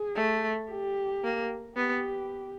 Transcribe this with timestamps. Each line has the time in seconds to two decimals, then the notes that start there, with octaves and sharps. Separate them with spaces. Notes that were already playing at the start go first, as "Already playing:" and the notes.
Already playing: G#4
0.16 A3
0.70 G4
1.24 A#3
1.77 B3 G4